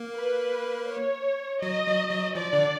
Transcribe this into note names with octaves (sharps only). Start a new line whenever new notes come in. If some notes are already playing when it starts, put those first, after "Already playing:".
Already playing: A#3
B4
C#5
F#3 D#5
F#3
F#3
F3 D5
D3